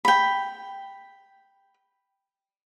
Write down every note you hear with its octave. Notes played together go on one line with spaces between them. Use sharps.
G5 B5